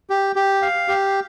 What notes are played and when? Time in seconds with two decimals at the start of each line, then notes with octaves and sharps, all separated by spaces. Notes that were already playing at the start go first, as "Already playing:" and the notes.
0.10 G4
0.36 G4
0.62 F5
0.88 G4